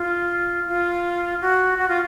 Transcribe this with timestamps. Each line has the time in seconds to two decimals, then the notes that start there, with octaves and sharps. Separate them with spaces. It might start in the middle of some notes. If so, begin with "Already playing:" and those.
Already playing: F4
0.68 F4
1.41 F#4
1.78 F#4
1.88 F4